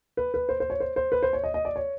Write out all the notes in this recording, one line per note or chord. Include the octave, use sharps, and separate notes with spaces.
B4
B4
C5
C5
C#5
C5
C5
B4
C5
C#5
D#5
D#5
D5
C#5